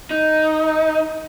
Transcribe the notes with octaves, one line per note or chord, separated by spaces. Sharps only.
D#4